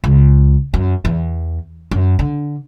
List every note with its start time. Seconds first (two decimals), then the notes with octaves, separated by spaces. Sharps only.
0.04 C#2
0.74 F#2
1.05 E2
1.91 F#2
2.19 D3